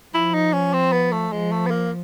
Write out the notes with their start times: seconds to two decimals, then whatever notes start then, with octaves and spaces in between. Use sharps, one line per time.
0.14 F3 E4
0.34 D#4
0.53 C#4
0.73 C4
0.92 B3
1.12 A3
1.32 F3 G#3
1.52 A3
1.66 B3
1.71 A#3